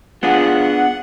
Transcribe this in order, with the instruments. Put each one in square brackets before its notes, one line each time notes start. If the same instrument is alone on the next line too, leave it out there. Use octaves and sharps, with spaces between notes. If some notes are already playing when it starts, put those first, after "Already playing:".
[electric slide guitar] B3 D4 G#4 [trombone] F4 [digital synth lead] F#5